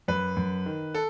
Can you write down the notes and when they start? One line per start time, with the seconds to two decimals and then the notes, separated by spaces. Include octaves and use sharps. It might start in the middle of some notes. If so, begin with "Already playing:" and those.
0.08 F#2 B4
0.37 F#2
0.66 D#3
0.94 A4